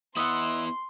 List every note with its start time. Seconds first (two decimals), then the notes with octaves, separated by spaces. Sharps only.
0.16 B3 E4 D#5 E5 F#5 C6